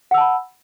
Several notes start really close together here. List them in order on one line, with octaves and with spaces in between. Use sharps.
F#5 E6 A5 B5